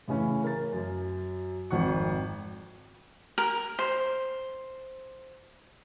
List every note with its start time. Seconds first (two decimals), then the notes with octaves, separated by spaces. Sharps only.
0.08 A2 C#3 E3 C#4
0.44 A#4 A6
0.73 F#2
1.70 G#1 F2 D#3 F#5 C#6
3.38 A#4
3.79 C5